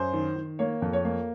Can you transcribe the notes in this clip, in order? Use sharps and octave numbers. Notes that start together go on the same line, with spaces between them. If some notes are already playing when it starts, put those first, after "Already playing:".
Already playing: F#2 C5
D#3
D#3
A#3 C#5
F2
C#5
A#3